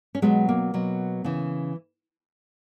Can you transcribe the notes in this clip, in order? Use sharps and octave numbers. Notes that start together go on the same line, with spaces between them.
C#4
B2 F#3 G#3 B3
A#3
B2 F#3
C#3 E3